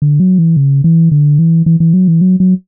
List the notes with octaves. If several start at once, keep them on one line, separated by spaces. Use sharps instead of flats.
D3
F#3
E3
C#3
E3
D3
E3
E3
E3
F#3
E3
F#3
F#3